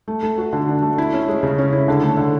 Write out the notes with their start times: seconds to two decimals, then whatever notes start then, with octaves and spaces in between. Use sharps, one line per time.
0.08 A3
0.23 A3
0.38 F#4
0.53 D3
0.68 D4
0.82 A3
0.98 E4
1.13 C#4
1.28 G#3
1.43 C#3
1.58 C#4
1.72 E4
1.88 D3
2.03 A3
2.17 D3